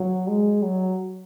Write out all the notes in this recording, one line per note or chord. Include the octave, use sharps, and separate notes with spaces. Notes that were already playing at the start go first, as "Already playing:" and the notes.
Already playing: F#3
G#3
F#3